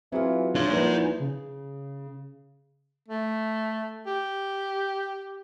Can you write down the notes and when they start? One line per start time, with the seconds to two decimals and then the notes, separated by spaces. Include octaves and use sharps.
0.12 E3 F#3 C4 F4 G#4 F5
0.55 C#3 D4 D#4 C6
0.71 E2 F3 A#3 B4 G#5
1.19 C#3
3.08 A3
4.06 G4